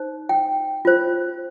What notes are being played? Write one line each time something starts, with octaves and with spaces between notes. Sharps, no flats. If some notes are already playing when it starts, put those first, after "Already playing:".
Already playing: D#4 C5
G5
F4 C5